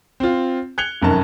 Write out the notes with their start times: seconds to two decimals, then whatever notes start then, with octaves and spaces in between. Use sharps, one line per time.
0.20 C4 F4
0.78 F#6 G#6 C#7 F7 G7
1.02 F1 F#2 D#3 A5